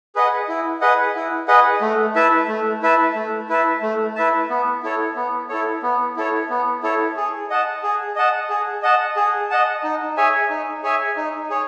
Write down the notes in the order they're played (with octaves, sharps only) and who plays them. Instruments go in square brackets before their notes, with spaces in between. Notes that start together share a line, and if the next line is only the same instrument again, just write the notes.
[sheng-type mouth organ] G#4 B4 D#5 F#5
E4
G#4 B4 D#5 F#5
E4
G#4 B4 D#5 F#5
A3
E4 B4 E5 A5
A3
E4 B4 E5 A5
A3
E4 B4 E5 A5
A3
E4 B4 E5 A5
B3
E4 A4 C#5
B3
E4 A4 C#5
B3
E4 A4 C#5
B3
E4 A4 C#5
G#4
D#5 F#5 A5
G#4
D#5 F#5 A5
G#4
D#5 F#5 A5
G#4
D#5 F#5 A5
D#4
G#4 C#5 E5 G#5
D#4
G#4 C#5 E5 G#5
D#4
G#4 C#5